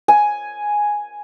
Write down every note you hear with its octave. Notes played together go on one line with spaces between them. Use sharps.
G#5